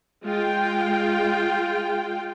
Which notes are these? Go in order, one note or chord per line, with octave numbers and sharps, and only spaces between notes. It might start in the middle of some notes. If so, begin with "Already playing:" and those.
G#3 F4 G5